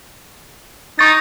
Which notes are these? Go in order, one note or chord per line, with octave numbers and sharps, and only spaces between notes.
D#4 C#6 A6